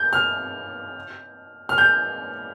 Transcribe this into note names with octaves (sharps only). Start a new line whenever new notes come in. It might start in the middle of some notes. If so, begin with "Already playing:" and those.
Already playing: G6
F6
F6
G6